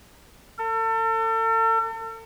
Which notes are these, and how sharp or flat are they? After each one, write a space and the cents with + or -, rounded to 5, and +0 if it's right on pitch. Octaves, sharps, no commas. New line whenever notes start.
A4 +40